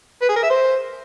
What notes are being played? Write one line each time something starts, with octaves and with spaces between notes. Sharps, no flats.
B4
G#4
A#4
E5
C5